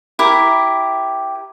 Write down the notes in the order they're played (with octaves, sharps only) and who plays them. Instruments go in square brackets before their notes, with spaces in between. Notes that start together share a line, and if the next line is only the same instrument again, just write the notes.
[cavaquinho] E4 G4 A#4